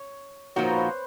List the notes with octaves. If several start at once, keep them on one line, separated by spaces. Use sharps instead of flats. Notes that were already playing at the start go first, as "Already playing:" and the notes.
Already playing: C#5
A#2 F3 A#3 D#4 F#4 C#5
C5
B4
C5